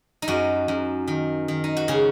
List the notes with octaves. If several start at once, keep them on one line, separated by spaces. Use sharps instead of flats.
D#4
F#2 F#4
F#2
D#3
D#3
D#4
F#4
C#3 G#4